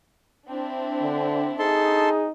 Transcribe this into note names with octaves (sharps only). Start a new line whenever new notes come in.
C4 D4 E4
D3
D#4 G#4 A4 A5 C6